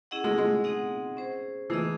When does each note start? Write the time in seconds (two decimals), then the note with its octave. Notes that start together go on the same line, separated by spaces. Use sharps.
0.11 C#4 E4 G#4 D#5 F#5
0.24 G#3
0.38 G#3
0.64 C4 D#4 G#4 D#5 F#5
1.17 C#4 G#4 C5
1.70 E3 A3 D#4 G#4 D#5